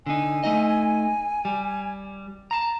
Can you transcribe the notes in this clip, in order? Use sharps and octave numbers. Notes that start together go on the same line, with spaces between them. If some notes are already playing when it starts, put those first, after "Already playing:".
D3 D#4 G#5
A3 D#4 D#5
G3
A5 A#5